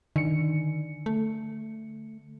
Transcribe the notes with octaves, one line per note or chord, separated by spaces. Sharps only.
D3 D#3 C#7
A3